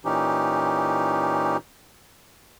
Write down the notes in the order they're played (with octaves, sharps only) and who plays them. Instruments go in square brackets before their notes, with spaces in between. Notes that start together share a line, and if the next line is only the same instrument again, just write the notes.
[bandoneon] A#2 E3 C#4 D#4 G4